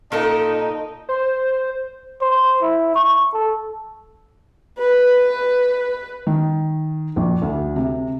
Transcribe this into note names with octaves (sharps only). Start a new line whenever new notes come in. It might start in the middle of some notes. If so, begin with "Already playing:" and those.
A#2 D#4 A4 A#4
C5
C5
E4
C#6
A4
B4
D#3
A#1
D2
C3